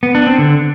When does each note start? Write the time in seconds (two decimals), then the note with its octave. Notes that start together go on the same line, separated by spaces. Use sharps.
0.03 B3
0.15 D4
0.27 C4
0.38 D3